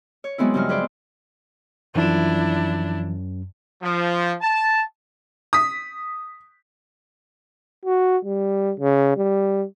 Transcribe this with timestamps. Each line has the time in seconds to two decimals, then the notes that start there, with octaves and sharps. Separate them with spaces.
0.24 C#5
0.38 F#3 G#3 B3 C4 E4
0.54 G2 C#3 F3 F#3 G#3 F6
0.69 G#4 B4 C5 D5 E5
1.95 F#2 E3 F3 D4 E4
3.83 F3
4.42 A5
5.53 D#6 B6
7.85 F#4
8.25 G3
8.80 C#3
9.17 G3